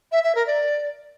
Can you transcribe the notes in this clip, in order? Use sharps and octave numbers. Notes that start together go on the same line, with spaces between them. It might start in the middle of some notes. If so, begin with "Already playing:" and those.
E5
E5
A#4
D5